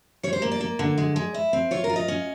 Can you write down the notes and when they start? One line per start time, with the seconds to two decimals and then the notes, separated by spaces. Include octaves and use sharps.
0.23 G3 C#5
0.33 C5
0.42 A#3
0.51 D5
0.61 A#3
0.79 D3
0.98 G#3
1.16 G#3
1.34 E4
1.53 C4
1.71 F4 C#5
1.84 A#4
1.90 F4
1.96 D#5
2.08 C#4